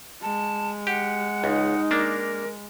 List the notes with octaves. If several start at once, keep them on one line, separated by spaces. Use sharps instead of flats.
G#3 A5
G4 F#5
C#2 D#4
A#3 D4 A#4